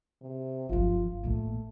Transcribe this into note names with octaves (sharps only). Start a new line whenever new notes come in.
C3
G1 F3 F4
A1 A3 A#3